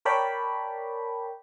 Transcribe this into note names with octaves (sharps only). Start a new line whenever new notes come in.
A#4 C#5 D5 G5 A5 B5